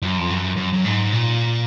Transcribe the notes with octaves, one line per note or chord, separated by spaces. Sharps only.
F#2
F2
F#2
F#2
F#2
G#2
A#2